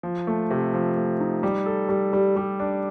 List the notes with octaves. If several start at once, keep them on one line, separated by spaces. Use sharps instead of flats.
F3
A3
C3
F3
A3
D#4
G3
A4
G3
G3
G3
D4